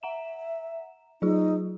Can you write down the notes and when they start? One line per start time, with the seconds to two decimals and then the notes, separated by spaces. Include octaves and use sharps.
0.03 E5 F#5 A#5 E7
1.22 F#3 D#4 F4 G#4